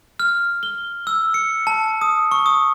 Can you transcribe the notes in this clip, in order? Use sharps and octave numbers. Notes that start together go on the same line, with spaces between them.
F6
G7
E6
C#7
A5
D#6
C#6
D#6